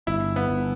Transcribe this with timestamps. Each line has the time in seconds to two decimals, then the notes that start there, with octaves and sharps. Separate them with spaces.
0.07 G1 E4
0.36 B3
0.50 G1